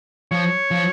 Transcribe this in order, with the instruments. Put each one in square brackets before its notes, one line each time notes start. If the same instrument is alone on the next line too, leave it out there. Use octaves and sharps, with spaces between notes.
[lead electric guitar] F3 [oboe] C#5
[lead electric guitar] F3